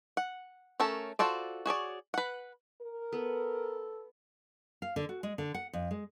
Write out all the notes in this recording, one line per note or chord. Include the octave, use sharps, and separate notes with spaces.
F#5
A3 C#4 A4 A#4
F4 F#4 A4 C5 D5
F#4 G#4 C#5 D5
B4 F#5
A#4
B3 A4 B4
F5
D3
F#4
G#3
D3
F#5
F2
G#3